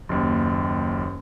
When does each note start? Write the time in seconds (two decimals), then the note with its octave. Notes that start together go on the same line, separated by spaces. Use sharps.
0.09 F#1 D#2